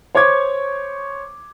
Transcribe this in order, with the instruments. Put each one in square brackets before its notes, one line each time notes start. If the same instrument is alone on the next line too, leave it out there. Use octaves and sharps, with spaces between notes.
[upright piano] C5 C#5 C#6 D6 G#6